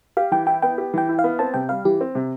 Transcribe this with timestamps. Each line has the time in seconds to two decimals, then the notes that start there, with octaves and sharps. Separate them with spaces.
0.17 G4 F5
0.32 E3 G5
0.47 E4 G5
0.62 B3 G5
0.78 G4
0.94 E3 G5
1.09 E4
1.19 F5
1.24 B3
1.39 C4 A5
1.54 C3 G5
1.69 G3 F5
1.85 E3 G4
2.01 C4
2.15 C3